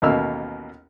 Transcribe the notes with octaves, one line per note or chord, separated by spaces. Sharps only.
A1 D#2 B2 A#3 E6 F6